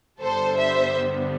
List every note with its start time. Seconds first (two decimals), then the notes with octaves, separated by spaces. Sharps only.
0.20 G2 D3 G3 B3 A4 C5
0.57 C5 E5